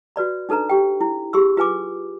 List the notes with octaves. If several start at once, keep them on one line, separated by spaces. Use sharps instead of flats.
F#4 B4 D5 B5
D4 D#4 A4 B4 A#5
G4 G5
E4
G4 G#4 C6 E6
F4 B4 G#5 D6